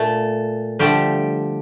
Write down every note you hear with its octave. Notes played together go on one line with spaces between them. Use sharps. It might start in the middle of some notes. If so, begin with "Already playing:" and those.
Already playing: A#2 A3 A4
D3 F3 G3 A3 G4